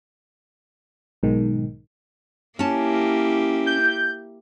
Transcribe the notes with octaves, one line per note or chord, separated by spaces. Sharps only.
B1 G#2 D#3
A#3 C#4 E4 G4 A5
G6